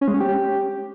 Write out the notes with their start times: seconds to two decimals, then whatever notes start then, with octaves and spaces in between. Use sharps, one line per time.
0.01 C#4
0.08 G#3
0.14 C#4
0.20 G4